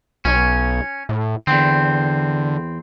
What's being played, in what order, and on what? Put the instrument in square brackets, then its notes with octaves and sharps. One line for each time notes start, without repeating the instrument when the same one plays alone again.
[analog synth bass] B1 [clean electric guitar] C#4
[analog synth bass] A2
[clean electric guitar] E2 C4 [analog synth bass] D3